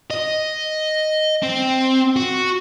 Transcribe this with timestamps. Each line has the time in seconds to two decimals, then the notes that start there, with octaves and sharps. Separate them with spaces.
0.11 D#5
1.43 C4
2.16 F#4